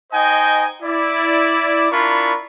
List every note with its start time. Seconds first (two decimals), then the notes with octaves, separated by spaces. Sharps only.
0.13 D#4 C5 D#5 G5 G#5
0.83 E4 D5
1.92 D4 E4 F4 A#4 B5 C#6